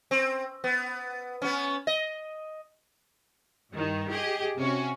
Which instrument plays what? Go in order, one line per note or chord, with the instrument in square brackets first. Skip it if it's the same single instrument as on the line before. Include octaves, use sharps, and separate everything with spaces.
[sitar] C4
B3
B3 C#4
D#5
[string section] G2 D#3
G4 G#4 D#5
C3 C#4 F#4